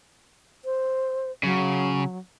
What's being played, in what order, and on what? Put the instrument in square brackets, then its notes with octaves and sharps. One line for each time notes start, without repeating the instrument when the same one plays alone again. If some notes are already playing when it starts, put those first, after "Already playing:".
[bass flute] C5
[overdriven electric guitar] C#3 [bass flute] F#3